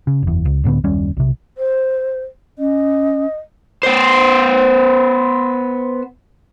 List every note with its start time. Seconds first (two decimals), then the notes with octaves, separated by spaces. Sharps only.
0.07 C#3
0.23 F#1 E2
0.45 C#2
0.64 C#2 A2 D3 B3
0.84 F#1 D#2 G3 C#4
1.17 B1 C3
1.58 C5
2.59 C#4 D#5
3.83 B3 C5